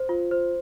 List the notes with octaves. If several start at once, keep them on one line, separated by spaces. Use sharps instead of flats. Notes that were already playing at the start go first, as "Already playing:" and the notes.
Already playing: C5
F4
C5